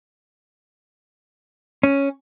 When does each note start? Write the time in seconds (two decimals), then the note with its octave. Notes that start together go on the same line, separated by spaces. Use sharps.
1.83 C#4